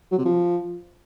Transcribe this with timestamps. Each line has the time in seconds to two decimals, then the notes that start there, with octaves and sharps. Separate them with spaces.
0.12 F#3
0.18 C3
0.25 F3